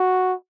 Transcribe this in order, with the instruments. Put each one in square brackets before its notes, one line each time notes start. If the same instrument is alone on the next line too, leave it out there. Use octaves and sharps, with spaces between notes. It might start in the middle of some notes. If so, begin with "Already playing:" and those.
Already playing: [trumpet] F#4